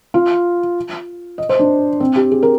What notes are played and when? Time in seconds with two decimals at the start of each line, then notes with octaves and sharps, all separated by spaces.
0.14 F4
1.38 D#5
1.49 C5
1.59 D4
2.00 C4
2.16 G4
2.32 G#4
2.43 A#4